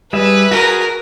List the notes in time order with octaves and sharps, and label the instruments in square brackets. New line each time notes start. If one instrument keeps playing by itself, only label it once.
[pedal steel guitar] G3 G#4 E5 [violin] B4
[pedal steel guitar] F#4 G#4 [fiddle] A#4